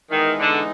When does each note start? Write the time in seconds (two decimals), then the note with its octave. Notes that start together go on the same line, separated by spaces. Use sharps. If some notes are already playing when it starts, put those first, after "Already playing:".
0.11 D#3 E3 G#3 B3 D#4
0.39 D3